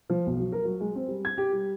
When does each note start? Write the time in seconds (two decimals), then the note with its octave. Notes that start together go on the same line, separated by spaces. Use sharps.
0.09 F3
0.27 B1
0.40 F#3
0.52 A#4
0.65 F#3
0.81 G#3
0.95 C4
1.08 G3
1.25 G#6
1.38 G4
1.52 G3